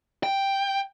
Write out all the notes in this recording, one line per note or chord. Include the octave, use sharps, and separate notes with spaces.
G5